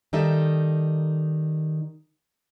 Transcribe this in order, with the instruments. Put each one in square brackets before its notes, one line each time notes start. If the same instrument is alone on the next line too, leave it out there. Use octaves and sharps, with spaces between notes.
[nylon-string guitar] D#3 G3 D#4 A4 E5